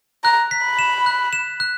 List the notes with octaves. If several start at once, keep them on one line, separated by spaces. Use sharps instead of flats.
A#5 F#6
B6
B5
E7
F#6
E7
F#6